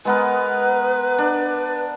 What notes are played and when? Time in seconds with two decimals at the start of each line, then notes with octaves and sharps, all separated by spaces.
0.05 G#3 B3 A#4 B4
1.18 D4